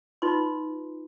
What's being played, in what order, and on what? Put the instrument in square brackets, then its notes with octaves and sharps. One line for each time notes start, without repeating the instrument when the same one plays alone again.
[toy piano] D#4 F4 B4 C6